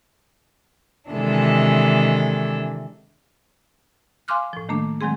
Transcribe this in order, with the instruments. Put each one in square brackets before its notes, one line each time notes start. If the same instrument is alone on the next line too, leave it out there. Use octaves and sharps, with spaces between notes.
[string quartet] C3 D#3 E3 G#3 D4 A4
[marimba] F5 G#5 C6 D6 F6 F#6
A2 F3
D#3 A3 A#3 D4
D#3 F#3 G#3 C4 G#4